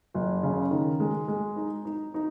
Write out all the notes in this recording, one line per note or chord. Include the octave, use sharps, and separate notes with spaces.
F#1
C#3
D#3
G#3
G#3
D#4
D#4
D#4